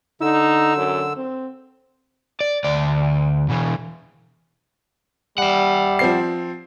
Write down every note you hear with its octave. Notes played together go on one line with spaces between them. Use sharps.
D3 D#4 E6
F#2
C4
D5
D2 D5
B2 E3
G3 E5 F#5
F3 C4 C7